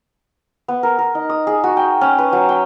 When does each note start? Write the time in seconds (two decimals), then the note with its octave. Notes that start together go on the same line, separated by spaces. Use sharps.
0.68 B3
0.83 A#4
0.99 A#4
1.15 D#4
1.30 D#6
1.47 G#4
1.64 F#4
1.77 G5
2.01 C#4
2.19 B4
2.33 F#3
2.49 G5